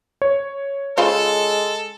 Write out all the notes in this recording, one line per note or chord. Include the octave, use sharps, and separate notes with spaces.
C#5
C#3 G#3 F4 A4 C5